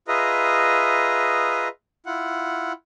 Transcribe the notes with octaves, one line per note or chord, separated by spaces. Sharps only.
F4 G#4 B4 D#5 E5 A#5
E4 F4 F#5